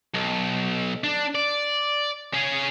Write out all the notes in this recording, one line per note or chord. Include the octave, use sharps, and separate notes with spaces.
B1
D4
D5
C#4 G#4